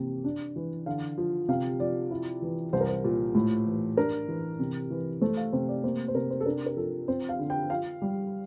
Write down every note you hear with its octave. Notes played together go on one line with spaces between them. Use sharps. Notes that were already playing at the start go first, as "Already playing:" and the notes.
Already playing: C3 E3 A#3
D4
E3
D3 F5
F3
C3 F5
F3 D5
E4
E3
C2 C5
A#4
C5
A#2
A2
E3
D4 A#4
E3
C3
E3
A3 C5
F5
C3 C5
D5
A#3 C5
C5
C3 A#4
C5
A4
D4 A#4
A#4
F3 A4
C4 C5
F5
D3
G5
F4 F5
G3